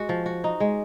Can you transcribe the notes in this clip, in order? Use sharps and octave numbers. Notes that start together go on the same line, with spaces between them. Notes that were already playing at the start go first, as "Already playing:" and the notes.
Already playing: G#3 F#4
F3
F#4
D#4
G#3